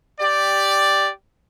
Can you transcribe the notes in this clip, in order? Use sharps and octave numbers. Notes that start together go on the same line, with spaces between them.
G4 D5